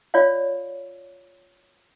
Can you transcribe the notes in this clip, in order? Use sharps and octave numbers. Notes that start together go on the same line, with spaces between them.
F4 C#5 D5 F5